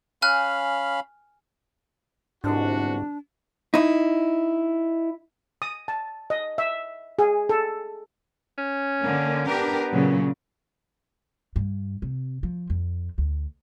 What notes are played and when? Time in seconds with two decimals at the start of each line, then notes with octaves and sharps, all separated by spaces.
0.22 C#4 F5 G#5 B5 F6 F#6
2.44 G1 C2 G#2 D4 F#4
3.74 D#4 E4
5.62 D#6
5.88 A5
6.30 D#5
6.58 E5
7.19 G#4
7.49 A4
8.58 C#4
9.01 D3 A#3
9.47 B3 D4 G4 A#4
9.90 A#2 C#3 F#3
11.56 G2
12.02 C3
12.43 F3
12.70 F2
13.18 D2